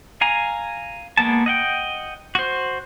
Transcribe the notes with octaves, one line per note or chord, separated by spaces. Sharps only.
F5 G#5 A#5
G#3 A#3 B3 A5
D#5 F#5 G5
F#4 C5